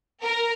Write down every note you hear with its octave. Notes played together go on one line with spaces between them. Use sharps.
A#4